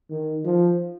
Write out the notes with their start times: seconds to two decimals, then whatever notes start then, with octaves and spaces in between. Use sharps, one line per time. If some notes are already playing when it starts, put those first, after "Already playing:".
0.10 D#3
0.45 F3